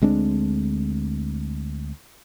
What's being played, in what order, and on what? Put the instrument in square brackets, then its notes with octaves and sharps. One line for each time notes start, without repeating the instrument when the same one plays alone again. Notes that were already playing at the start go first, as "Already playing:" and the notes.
[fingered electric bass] D2 G#3 C4 D4